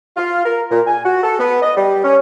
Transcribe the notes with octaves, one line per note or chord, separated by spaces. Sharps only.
F4
A#4
A#2
G#5
F#4
A4
B3
D#5
G3
C#4